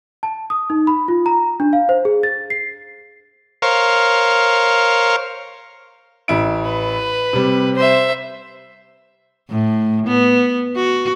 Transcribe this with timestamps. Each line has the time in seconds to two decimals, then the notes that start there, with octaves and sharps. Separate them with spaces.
0.23 A5
0.50 D#6
0.70 D#4
0.87 B5
1.08 F4
1.26 A#5
1.60 D4
1.73 F5
1.89 C5
2.05 G#4
2.23 A6
2.50 C7
3.62 A#4 C5 C#5 F5
6.28 A1 E4 D7
6.65 B4
7.33 C3 G3
7.74 C5 E5
9.49 A2
10.07 B3
10.76 F#4